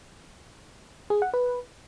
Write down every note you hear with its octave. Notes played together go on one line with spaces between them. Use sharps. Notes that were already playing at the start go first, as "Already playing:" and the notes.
G#4
F#5
B4